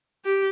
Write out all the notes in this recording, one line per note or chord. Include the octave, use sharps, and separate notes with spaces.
G4